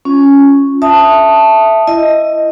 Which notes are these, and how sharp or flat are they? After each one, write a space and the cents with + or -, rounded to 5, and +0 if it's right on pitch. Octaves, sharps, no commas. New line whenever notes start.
C#4 +0 F4 +0
E5 +0 A5 +0 D#6 +0
E4 +20 D#5 +0